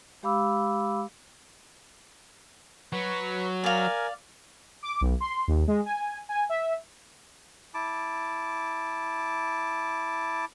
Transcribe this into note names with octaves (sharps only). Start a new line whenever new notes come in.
G#3 G4 F5 B5 D6 E6
F#3 B4 C#6
A#4 D5 F5 G#5
D6
B1
C6
D#2
G#3
G#5
G#5
E5
E4 A5 D6